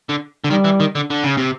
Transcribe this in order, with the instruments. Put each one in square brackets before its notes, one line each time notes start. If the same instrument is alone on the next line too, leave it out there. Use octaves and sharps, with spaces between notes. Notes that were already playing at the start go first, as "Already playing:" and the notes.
[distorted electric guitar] D3
D3
[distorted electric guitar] D#3 [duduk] G3
[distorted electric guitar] E3
D#3
D3
D3
C#3
C3